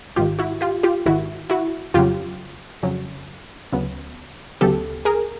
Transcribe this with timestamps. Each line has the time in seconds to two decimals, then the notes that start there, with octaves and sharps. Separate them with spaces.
0.16 G#1 G#2 D#3 F4 G4
0.39 E4 F#4
0.61 F4 G4
0.83 F4 G4
1.06 G#1 G#2 D#3 E4 F#4
1.50 E4 F#4
1.94 F2 C#3 F#3 F4 G4
2.83 F2 C#3 F#3
3.72 D2 C#3 F#3 B3
4.61 D2 C#3 F#3 B3 G4 A4
5.05 G#4 A#4